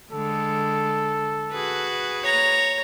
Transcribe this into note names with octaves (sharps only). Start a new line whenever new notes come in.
D3 G#3 A4
F#4 G#4 B4
C#5 A#5